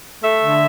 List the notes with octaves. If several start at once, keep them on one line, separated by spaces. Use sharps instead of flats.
A3 E5
D3